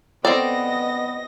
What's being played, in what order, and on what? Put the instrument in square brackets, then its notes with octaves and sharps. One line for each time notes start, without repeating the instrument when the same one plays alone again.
[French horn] B3 [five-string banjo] C4 A4 D5 [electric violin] D#5 A#6